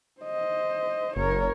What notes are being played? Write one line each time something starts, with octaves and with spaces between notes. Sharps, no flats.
C5 D#5
F#1 A#4 C#5